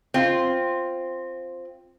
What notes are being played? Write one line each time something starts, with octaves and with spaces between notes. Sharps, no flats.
C4 F4